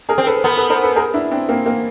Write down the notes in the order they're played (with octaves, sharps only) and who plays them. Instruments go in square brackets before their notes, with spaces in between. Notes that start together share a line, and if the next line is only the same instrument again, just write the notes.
[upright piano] G#4 A#4
[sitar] C4
[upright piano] A4 B4
[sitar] B3 [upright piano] A#4 C5
[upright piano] A4 B4
A#4 C5
A4 B4
G#4 A#4
D4 E4
C4 D4
A#3 C4
A#3 C4